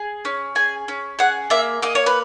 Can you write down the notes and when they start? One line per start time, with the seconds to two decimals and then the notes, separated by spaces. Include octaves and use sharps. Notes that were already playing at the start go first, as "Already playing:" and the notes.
Already playing: G#4
0.25 C#4
0.55 G#4 G#5
0.88 C#4
1.19 G#4 F#5
1.50 A#3 E5
1.82 A#3 D#5
1.95 C#5
2.06 B4